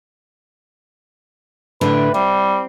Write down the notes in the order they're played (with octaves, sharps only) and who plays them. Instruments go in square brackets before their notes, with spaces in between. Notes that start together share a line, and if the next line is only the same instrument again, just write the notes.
[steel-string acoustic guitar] A2 D3 D4 [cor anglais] B4
[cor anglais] G3 [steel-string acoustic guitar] C4